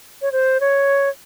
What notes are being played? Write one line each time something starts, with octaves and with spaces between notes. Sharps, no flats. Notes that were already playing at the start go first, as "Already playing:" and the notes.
C#5
C5
C#5